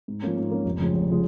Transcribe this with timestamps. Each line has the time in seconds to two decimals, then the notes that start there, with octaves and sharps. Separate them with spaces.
0.08 G#2
0.22 F3 A#3 C#4
0.37 G#2
0.51 F3 A#3 C#4
0.65 F1
0.79 F2 C#3 F3 G#3
0.93 F1
1.09 C#3 F3 G#3